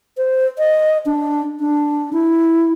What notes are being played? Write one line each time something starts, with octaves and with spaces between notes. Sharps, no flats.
C5
D#5
D4
D4
E4